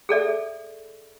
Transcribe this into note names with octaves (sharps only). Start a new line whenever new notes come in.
G#4 A4 D5 E5